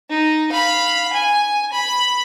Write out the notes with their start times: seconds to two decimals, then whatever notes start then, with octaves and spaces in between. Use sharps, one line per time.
0.10 D#4
0.52 F5 B5
1.13 G#5
1.72 B5